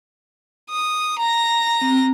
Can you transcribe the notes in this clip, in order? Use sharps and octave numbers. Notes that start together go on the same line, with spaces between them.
D#6
A#5 A#6
C4